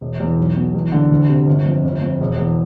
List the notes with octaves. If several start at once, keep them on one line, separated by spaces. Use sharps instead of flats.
E1
E2
B1
B2
E2
D3
D2
C3
G1
F2
G1
F2
E1
E2